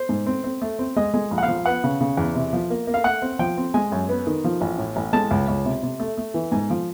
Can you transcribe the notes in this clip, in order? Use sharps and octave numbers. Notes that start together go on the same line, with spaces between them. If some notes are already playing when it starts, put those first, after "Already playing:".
Already playing: C5
G#2
C4
C4
A3
C4
G#3 D#5
G#3
A#1
F#5
F5
F3
B3 F#5
C#3
C#3
E2
C3
F3
A#3
A#3
F5
A3 F#5
C4
F3 G5
C4
G#3 G#5
F#2
B3
D#3
F3
A1
A2
A1
G#3 A5
C#2
C#2
C3
C3
A3
A3
E3
G#2 G#5
F3